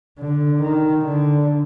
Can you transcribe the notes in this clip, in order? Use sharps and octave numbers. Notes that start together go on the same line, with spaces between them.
D3
D#3
D3